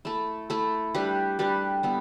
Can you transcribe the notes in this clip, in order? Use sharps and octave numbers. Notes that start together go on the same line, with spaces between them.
A3 E4 A4
A3 E4 A4
G3 D4 G4 B4
G3 D4 G4 B4
G3 B3 E4